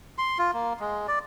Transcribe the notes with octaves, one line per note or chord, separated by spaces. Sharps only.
C6
F4
A#3
G#3
D5